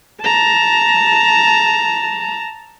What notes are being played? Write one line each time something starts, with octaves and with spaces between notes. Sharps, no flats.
A5 A#5